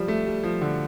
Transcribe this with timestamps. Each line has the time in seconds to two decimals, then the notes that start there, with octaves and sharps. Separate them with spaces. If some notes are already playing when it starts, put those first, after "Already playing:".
Already playing: F3 G3
0.08 A3
0.26 G3
0.43 F3
0.61 D3